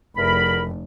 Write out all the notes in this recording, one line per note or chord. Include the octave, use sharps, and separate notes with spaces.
F1 E2 A#4 B5